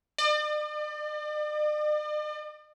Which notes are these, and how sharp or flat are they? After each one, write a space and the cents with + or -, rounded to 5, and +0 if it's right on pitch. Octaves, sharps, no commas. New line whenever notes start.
D5 +45